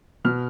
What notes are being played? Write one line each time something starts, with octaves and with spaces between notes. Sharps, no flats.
B2 F6